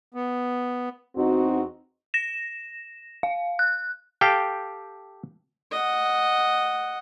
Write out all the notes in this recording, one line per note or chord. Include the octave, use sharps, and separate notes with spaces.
B3
E2 C4 D#4 F#4
A#6 E7
F5
F#6
G4 A4 F5 G5
D#5 F#5